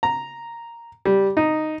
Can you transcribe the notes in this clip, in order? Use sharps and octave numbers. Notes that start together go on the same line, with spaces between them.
A#5
G3
D#4